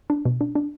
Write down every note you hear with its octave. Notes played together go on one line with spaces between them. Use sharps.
D4
B2
D4
D4